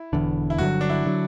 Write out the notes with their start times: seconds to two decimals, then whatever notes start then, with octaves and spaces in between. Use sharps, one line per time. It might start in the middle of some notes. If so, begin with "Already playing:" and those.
Already playing: E4
0.13 E1 E2 D3
0.50 E4
0.58 G1 G2 D3 F#3 F#4
0.81 D4
0.90 E4
1.06 D3 F#3